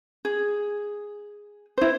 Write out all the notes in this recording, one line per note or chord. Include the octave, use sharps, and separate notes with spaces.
G#4
E4 C5